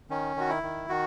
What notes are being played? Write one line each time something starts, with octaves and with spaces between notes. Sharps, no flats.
D#3 C#4
D#3 F#4
E4
D#3
D#3 F#4